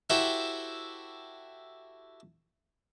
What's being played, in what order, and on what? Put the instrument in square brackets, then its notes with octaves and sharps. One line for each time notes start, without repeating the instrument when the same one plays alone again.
[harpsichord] E4 F#4 G4 A4 C5 E5